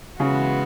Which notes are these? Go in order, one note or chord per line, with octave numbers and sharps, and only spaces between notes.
C#3 E3 G#3 B3 F#4